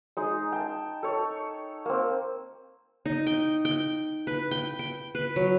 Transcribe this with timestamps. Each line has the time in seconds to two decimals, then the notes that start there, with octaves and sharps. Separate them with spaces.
0.17 G#3 D#4 G#4
0.52 G5 A5
1.03 A4 C#5
1.86 A#3 C4
3.06 D#4
3.27 G5
3.65 G5
4.27 B4
4.51 G5
4.79 G5
5.15 B4
5.36 F#3